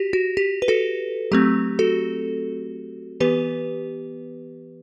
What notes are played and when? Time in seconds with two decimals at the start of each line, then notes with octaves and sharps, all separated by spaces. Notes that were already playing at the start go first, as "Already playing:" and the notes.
Already playing: F#4 G4
0.13 F#4
0.37 G4
0.62 B4
0.68 F#4 A4
1.32 F#3 A3 C4 G4
1.79 F#4 A4
3.20 E3 B3 G4 B4